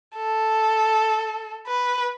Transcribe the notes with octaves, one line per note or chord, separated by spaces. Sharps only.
A4
B4